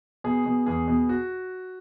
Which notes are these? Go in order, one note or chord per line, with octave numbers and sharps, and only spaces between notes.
B2 G#4
B2
E2 G#4
B2
F#4